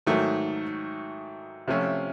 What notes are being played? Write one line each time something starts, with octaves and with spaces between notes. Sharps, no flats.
G#2 D#3 F#3 A3
C3 F3 A3 C#4 F4